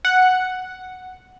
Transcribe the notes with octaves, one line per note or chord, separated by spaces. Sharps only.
F#5